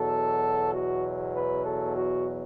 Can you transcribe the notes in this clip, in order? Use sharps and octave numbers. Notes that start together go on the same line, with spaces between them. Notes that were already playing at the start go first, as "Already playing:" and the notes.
Already playing: E2 B2 F#3 A4
F#4
B4
A4
F#4